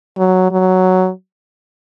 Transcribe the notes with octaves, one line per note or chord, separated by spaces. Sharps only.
F#3
F#3